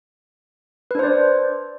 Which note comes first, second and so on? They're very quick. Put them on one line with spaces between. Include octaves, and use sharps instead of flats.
B4 D4 C5 D5